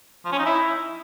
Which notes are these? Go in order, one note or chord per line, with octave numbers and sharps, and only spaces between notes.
F3
C#4
D#4
E4